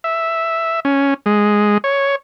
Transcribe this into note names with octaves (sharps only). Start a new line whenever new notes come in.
E5
C#4
G#3
C#5